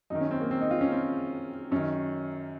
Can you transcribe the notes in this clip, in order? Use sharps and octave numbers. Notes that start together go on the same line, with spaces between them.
F#2 D#3 D#4
C#4
C4
A#3
C4
D#4
F4
C#4
C4
F#2 D#3 C#4